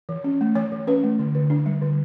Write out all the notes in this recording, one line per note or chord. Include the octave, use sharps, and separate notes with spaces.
E3
C#4
A3
E3 C#5
E3
C#4 B4
A3
D3
D3
D4
G3
D3